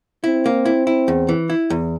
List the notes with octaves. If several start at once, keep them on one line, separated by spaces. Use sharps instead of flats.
C4 E4
A#3
E4
E4
E2
E3
E4
E2